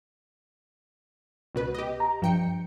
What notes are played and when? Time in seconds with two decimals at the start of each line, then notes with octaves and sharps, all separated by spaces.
1.55 C#2 B2 B4
1.75 G4 D#5
2.00 A#5
2.22 G2 F3 G5 C#7